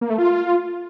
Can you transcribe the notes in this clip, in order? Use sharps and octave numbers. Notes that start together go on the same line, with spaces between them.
A#3
A3
F4